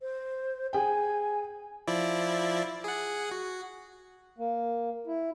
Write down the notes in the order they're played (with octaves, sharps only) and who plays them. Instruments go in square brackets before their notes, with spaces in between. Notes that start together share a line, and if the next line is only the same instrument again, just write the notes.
[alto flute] C5
[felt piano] G#4 G5 [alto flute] G#5
[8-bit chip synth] F3 E4 D5
G#4 F#5
F#4
[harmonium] A#3
E4